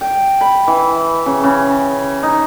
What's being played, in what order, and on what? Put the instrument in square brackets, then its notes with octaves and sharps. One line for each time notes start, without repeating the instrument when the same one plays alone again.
[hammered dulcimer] G5
B5
E3
C#3
C#3
D#4